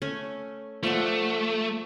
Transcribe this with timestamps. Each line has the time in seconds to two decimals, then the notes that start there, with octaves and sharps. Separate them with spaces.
0.02 A3 C#4 G#5
0.83 F3 A3 D5 F#5